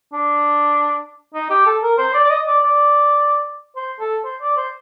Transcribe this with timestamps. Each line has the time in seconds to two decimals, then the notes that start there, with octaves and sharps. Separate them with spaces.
0.13 D4
1.34 D#4
1.50 G4
1.66 A4
1.83 A#4
1.98 C5
2.14 D5
2.24 D5
2.30 D#5
2.47 D5
2.63 D5
3.76 C5
4.00 A4
4.25 C5
4.41 D5
4.57 C5